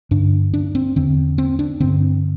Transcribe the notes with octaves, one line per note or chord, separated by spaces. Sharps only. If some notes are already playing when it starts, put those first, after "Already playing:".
G2 D3 D4
D4
C4
E2 D3 C4
C4
D4
G2 D3 C4